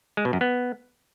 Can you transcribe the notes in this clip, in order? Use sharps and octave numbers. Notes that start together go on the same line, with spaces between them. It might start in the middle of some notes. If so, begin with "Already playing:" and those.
G#3
B2
F#2
B3